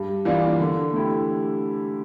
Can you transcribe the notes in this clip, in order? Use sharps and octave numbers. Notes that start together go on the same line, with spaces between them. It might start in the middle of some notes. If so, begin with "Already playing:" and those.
Already playing: G2
E3 A#3 D4 F4
D3
A3 E4 G4